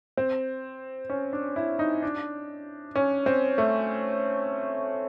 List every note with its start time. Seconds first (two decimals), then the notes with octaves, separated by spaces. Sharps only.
0.17 C4
1.10 C#4
1.33 D4
1.56 E4
1.79 D#4
2.02 D4
2.96 C#4
3.26 C4
3.58 A3